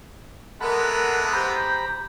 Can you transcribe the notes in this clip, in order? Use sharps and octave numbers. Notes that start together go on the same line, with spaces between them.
E3 G#3 B3 A4 A#4 F#5 B5
G4 C5 A#5 B5 G6